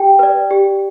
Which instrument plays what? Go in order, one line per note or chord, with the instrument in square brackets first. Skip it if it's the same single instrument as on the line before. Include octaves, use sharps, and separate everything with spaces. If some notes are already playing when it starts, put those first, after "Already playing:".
Already playing: [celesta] G4 G5
B4 D5
G4